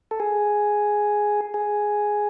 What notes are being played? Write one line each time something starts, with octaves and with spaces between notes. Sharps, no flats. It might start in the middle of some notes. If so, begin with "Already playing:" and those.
A4
G#4
G#4